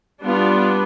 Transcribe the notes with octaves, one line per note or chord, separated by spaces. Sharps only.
G3 B3 D4 F4